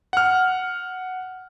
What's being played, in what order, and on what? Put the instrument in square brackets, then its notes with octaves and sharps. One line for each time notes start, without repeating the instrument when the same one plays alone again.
[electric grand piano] F#5 F6